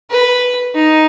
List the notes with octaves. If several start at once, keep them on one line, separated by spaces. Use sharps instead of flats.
B4
D#4